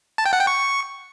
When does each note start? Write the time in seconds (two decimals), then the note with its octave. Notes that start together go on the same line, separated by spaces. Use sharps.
0.18 A5
0.25 G5
0.33 F#5
0.40 G5
0.47 C#6